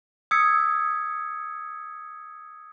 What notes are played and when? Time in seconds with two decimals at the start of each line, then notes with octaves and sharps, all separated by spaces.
0.31 D#6 E6 G#6 B6 C#7